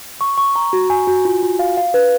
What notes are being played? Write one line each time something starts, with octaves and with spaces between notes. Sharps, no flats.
C#6
C#6
A#5
F#4
G#5
F#4
F4
F4
F5
F5
B4